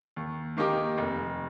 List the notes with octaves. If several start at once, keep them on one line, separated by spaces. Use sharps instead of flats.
D#2
D#3 A#3 D#4 G4
F1